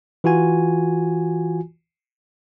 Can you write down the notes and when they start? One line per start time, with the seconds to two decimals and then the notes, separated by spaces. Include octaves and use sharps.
0.24 E3 F4 F#4 G#5